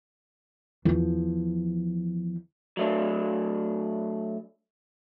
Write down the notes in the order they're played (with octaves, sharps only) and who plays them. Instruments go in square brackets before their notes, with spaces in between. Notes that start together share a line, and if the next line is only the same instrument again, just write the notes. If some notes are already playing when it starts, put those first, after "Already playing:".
[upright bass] E2 F3
[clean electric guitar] F#3 A3 D4